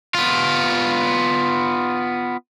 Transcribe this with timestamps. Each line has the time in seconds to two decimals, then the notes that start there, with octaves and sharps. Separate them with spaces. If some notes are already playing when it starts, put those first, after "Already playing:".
0.15 B3 F4